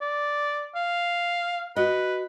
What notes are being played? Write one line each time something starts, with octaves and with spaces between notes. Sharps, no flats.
D5
F5
F#4 B4 D#5